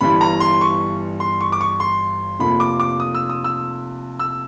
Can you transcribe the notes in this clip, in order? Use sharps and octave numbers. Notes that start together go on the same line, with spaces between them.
G1 G2 E3 G3 B5
A#5
C6
C#6
C6
C#6
D6
C#6
C6
F1 F2 C3 F3 A#3 B5
D6
D6
D#6
E6
D#6
E6
E6